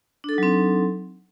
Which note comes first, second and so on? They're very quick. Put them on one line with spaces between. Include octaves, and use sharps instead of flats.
D4 A4 D#4 F#3 C4